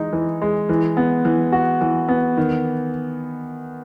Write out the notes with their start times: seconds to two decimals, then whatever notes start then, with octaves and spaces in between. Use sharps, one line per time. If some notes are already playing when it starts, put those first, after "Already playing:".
Already playing: E3 G#3 D#4
0.13 E3
0.42 G#3
0.69 E3
0.97 B3
1.25 E3
1.52 F#4
1.81 E3
2.09 B3
2.37 D#3